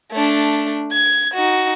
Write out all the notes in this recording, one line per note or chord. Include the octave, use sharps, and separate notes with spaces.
A3 D4
G#6
D#4 F#4